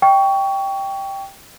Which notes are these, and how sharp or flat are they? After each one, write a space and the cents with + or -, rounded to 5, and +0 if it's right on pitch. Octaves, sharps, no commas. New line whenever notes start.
D#5 +0 G5 +0 C#6 +20